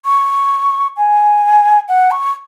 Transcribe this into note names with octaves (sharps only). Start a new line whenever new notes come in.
C#6
G#5
F#5
C#6